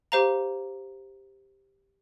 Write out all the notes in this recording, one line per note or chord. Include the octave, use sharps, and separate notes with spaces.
G4 C5 F5 A#5